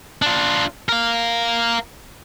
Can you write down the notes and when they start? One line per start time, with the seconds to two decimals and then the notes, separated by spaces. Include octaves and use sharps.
0.22 D4 F4
0.89 A#4 F5